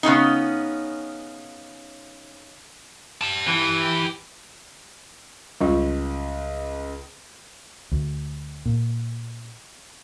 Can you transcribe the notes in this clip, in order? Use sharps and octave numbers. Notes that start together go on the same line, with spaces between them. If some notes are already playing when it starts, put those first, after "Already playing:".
C#3 B3 C#4 D#4
G4 A5
E3
C#2 G3 F4
D2
A#2